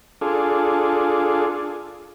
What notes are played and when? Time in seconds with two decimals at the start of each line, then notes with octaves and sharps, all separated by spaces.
0.21 D4 F4 G#4 A4